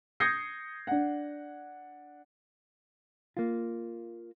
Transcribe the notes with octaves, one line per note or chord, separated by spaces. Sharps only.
D#6 G6 G#6 A#6 C7 C#7
D4 F#5
A#3 F4